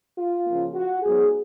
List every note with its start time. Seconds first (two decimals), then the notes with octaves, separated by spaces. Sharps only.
0.17 F4
0.46 C#3 F3 A#3
0.74 F#4
1.02 G#2 F#3 B3 D#4 G#4